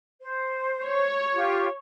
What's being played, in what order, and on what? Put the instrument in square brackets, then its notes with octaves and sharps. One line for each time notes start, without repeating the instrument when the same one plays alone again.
[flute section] C5
[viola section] C#5
[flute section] F4 G4